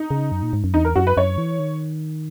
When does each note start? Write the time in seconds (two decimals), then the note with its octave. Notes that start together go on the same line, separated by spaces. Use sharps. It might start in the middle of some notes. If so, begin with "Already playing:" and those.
Already playing: D#4
0.11 C#3
0.32 F#2
0.43 A#2
0.53 G#2
0.64 F#2
0.74 E2 D#4
0.85 A#4
0.96 F#2 F#4
1.07 B4
1.17 F#2 C#5
1.38 E3
1.59 D#3